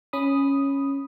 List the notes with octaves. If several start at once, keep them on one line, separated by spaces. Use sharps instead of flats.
C#4 B5 D#6